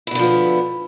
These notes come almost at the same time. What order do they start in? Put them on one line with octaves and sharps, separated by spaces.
E4 B2 D3 F3 B3